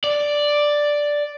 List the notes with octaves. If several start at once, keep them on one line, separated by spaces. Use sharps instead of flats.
D5